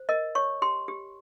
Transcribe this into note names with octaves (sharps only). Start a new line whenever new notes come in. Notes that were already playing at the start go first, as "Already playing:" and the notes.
Already playing: C5
A#4 D#5
C#5 C#6
G4 C6
G4